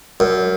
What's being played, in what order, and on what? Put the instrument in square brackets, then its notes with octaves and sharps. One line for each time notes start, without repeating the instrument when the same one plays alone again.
[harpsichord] F#2